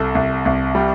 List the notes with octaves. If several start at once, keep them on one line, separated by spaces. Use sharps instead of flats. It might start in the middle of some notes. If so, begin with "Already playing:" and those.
Already playing: C2 A4
C2
C2
G3